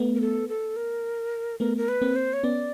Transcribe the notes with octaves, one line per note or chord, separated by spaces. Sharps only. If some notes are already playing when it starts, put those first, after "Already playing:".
Already playing: A3 B3
A#4
A4
A4
A#4
A3 B3 A#4
A#4
B4
A#3 C4
C5
C#5
B3 C#4 D5